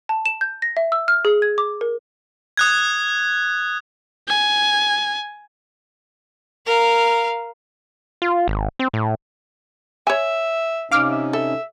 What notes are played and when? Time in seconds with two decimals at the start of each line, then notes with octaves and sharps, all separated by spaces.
0.09 A5
0.26 E7
0.41 G6
0.62 A#6
0.77 E5
0.92 E6
1.08 F6
1.25 G#4
1.42 G#6
1.58 D6
1.81 A#4
2.57 D#6 F#6 G#6
4.28 G#5
6.66 A#4 F5
8.22 F4
8.48 G#1
8.79 C4
8.93 A2
10.07 C#5 E5 G#5
10.91 C3 C#4 D#4 F5 D6 F6
11.11 E5
11.33 A4 E5